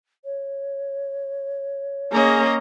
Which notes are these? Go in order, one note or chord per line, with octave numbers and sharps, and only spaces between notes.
C#5
A#3 C#4 G#4 D#5 A#5